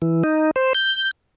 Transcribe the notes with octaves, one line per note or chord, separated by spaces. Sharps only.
E3
D#4
C5
G6